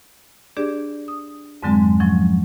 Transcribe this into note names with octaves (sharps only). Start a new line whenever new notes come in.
D4 G4 G#4 D5
D#6
F2 G#2 D3 F#3 G#3 C4
F3 F#3 C#4